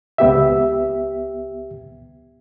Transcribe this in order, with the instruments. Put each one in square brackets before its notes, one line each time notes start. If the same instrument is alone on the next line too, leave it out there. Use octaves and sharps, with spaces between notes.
[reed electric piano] C#2 B3 G4 E5